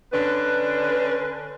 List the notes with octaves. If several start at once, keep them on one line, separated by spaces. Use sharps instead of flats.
D3 C#4 D4 B4